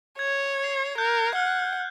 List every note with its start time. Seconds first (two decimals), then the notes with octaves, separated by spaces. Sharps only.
0.19 C#5 G#6
0.64 C7
0.98 A#4 F#6 G6
1.35 F#5 F6 F#6